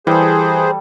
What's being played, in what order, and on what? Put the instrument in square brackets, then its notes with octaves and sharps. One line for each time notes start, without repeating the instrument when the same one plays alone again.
[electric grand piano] E3 [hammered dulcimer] G3 A4 [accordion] G#4 C5